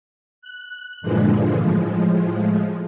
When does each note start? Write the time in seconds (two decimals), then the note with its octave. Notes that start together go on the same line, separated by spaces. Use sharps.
0.42 F#6
1.02 G2 A#2 D3 E3 F3 G#3
1.58 A2 F3 G#3